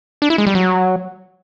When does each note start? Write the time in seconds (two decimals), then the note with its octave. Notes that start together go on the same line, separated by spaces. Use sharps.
0.22 D4
0.30 E4
0.38 G#3
0.47 G3
0.55 F#3